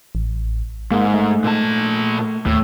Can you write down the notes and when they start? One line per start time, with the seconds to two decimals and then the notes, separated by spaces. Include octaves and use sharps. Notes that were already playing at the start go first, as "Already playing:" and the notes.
0.15 A1
0.91 G#2 A#3
1.14 A3
1.44 A#2 A5
2.46 D#2 A2